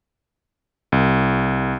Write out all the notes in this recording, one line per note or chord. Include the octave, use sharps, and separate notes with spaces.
C2